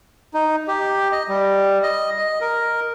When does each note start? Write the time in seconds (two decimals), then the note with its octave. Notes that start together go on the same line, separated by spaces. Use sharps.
0.34 D#4
0.68 G4
1.12 D#5
1.28 G3
1.83 D#5
2.18 D#5
2.41 A#4